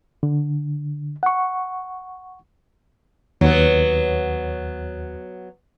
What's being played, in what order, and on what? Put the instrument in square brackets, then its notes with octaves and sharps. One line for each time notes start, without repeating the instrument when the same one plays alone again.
[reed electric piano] D3
F#5 C#6
[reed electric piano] D#2 [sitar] F#3 B3